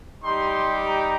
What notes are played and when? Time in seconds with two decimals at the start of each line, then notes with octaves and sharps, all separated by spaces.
0.24 G3 D#4 G4 C6
0.86 A#5